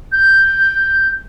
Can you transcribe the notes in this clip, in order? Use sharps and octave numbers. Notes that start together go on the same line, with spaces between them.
G6